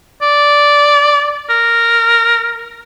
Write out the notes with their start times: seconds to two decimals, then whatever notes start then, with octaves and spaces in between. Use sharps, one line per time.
0.22 D5
1.50 A#4